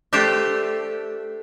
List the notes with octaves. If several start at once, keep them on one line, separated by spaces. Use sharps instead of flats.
A3 D4 G4 C5 E5